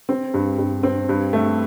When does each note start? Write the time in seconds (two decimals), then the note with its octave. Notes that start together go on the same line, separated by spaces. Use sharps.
0.09 C4
0.34 G2
0.58 G2
0.83 C4
1.09 G2
1.33 A3